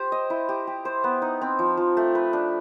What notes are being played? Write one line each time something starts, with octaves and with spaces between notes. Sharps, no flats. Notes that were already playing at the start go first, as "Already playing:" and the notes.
Already playing: G4 C5
D#5
E4
G4
G4
C5
B3
D#4
C4
F3
F3
A3
B4
D4